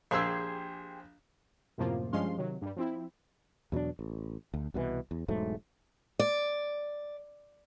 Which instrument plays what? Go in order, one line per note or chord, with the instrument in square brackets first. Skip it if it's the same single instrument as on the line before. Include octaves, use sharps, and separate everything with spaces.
[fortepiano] A#1 E6 [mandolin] G4 G#4 C5
[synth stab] F#2 A2 C3 F3 A#3 F4
G2 F3 G#3 C#4 F5 C6
C3 D#3 F#3
G2 G3
F3 C4 E4
[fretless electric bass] E2 B2 F#3 D4
A1
D2
C2 B2 D3 E3
E2
E1 G#2 F#3 A3
[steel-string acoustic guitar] D5